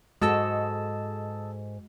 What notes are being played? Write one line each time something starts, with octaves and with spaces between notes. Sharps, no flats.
G#2 G#3 F#4 A4 D#5 A5 E6